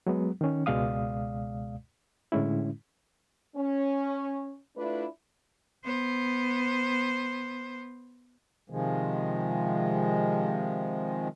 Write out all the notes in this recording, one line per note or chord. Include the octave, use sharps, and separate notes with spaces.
F#3 G#3 B3
D#3 C#4
C#2 B2 G#3 D5 F5 D#6
A2 D3 G#3 C#4 E4
C#4
A3 D4 E4 F4 B4 D5
B3 C5
C3 D#3 F3 G#3